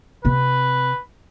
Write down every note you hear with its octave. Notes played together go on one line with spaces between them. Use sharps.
C3 C4 B4